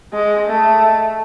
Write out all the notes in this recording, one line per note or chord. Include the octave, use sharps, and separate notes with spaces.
G#3
A3